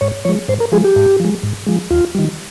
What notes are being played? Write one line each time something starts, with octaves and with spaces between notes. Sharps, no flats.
G#2 C#5
F3 G#3 C#5
G#2 C5
A#4
F3 G#3 G#4
G4
G#2
F3 G#3
G#2
F3 G#3
D#2 F4
D#3 G3